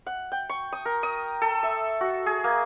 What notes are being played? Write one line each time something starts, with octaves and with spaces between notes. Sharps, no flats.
F#5
G5
C#6
D#6
A#4
D#6
A4
E5
F#4
G#4
A#3